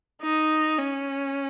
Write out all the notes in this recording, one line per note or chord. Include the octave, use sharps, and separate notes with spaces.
D#4
C#4